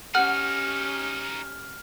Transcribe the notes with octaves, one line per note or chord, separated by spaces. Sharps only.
C#4 D#4 F#4 G4 F#5 F6